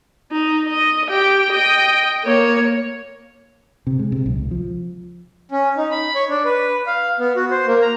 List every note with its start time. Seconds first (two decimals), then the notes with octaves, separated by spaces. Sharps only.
0.32 D#4
0.68 D#5
1.09 G4 G5
1.52 D#5 G5
2.25 A#3 C#5
3.87 C3
3.99 G#3
4.12 C3
4.26 B1
4.38 C#2
4.51 F3
5.52 C#4
5.77 D#4
5.91 B5
6.15 C#5
6.29 D4
6.45 B4
6.87 F5
7.20 B3
7.36 F#4
7.51 C5
7.67 A#3
7.82 A#5